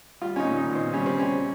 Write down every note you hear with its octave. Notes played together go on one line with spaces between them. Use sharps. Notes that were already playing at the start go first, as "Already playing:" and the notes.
G3 F4
C#4
D#4
A#2
D#4
A#2
C4
G3 C#4
C4
G3 C#4